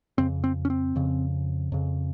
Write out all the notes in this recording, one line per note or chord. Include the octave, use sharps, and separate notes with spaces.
F2 C#3 C4
C4
C#4
C4
F2 C#3
F2 C#3